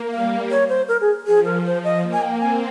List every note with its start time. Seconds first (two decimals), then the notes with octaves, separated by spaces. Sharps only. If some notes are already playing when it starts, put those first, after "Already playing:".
Already playing: A#3
0.12 G3 F5
0.51 C#5
0.69 C5
0.88 A#4
1.01 G#4
1.27 F3 G#4
1.45 A#4
1.65 C5
1.84 D#5
2.02 A#3
2.13 G#5
2.22 G5
2.40 C4 G#5